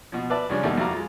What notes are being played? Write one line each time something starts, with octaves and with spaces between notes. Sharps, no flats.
B2 F3
B4 D5 E5 A5
C#2 C#3 F3 G3 C#4 D4
D#2 B2 G3 D#4 E4 A4
F2 E4 F#4 F5 A#5 D6
G#3 F4